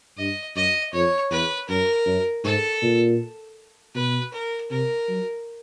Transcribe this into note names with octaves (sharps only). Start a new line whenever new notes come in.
G2 D#5
F#2 D#5
F2 C#5
E2 B4
F#2 A#4
F#2
G#2 A4
A#2
B2 B4
A#4
C3 A#4
F#3